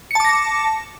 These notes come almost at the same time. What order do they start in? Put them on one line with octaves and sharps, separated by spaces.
C#7 A5 D6 A#6